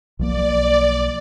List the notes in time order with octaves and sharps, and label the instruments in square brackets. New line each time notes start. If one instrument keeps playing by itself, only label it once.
[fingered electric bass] B1 F3 A#3 [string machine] D5